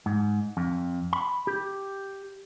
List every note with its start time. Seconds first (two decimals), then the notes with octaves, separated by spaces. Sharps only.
0.06 G#2
0.57 F2
1.13 B5
1.47 G4